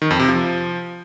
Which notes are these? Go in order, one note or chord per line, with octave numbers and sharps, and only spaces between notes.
D#3
F2
C3
F3